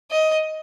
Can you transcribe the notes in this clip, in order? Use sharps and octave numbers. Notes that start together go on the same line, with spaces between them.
D#5